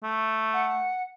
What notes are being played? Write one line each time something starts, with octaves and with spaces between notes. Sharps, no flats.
A3
F#5